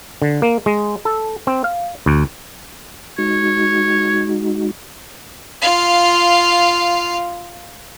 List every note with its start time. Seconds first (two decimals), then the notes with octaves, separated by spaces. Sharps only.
0.22 D3
0.42 A#3
0.66 G#3
1.05 A4
1.47 C4
1.64 F5
2.06 D2
3.18 G#3 D#4 F#4 C#5
5.62 F4 F5